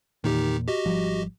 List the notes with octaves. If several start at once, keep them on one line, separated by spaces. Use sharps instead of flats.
E2 A#2 D#3 D#4 G4
F#4 G4 D#5
G#1 F3 G3